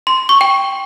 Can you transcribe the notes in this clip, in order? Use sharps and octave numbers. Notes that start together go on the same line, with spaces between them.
C6
C#6
G5